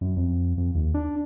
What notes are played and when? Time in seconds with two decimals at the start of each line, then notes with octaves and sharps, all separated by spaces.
0.01 F#2
0.16 F2
0.58 F2
0.75 D#2
0.94 D4